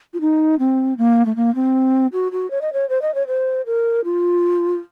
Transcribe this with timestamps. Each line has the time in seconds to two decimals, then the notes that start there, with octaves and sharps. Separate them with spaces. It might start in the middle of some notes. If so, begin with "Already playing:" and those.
0.14 F4
0.21 D#4
0.59 C4
0.98 A#3
1.26 A3
1.36 A#3
1.55 C4
2.13 F#4
2.32 F#4
2.51 C#5
2.61 D#5
2.73 C#5
2.89 C5
3.02 D#5
3.15 C#5
3.27 C5
3.66 A#4
4.05 F4